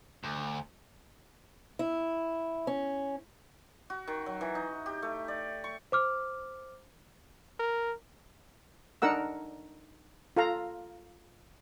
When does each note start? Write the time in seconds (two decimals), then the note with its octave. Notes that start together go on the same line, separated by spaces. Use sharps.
0.23 D2
1.79 E4
2.67 C#4
3.90 F#4
4.08 D#3
4.26 F#3
4.41 E3
4.55 D#4
4.86 G4
5.02 A3
5.28 D5
5.64 C#6
5.92 C5 D6 F6
7.59 A#4
9.02 D4 D#4 A#4 F#5 E6
10.36 F4 A4 F5 A#5